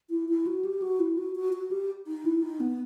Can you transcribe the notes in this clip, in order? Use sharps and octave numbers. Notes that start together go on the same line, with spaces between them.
E4
E4
F#4
G4
F#4
E4
F#4
F#4
F#4
G4
D#4
E4
D#4
B3